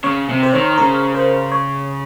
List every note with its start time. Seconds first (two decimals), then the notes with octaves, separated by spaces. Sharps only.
0.04 C#3 C#5
0.29 C3
0.43 C5
0.53 D#3 C#5
0.78 C#3 A#4
1.15 C5
1.52 C#5